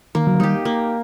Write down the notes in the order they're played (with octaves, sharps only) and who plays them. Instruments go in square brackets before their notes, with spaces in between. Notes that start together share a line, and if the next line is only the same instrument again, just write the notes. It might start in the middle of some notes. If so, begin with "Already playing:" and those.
[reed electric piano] D#3 [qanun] A#3
[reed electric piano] D3 F#3
[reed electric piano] D#3 G3 [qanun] D#4 G4
[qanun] A#3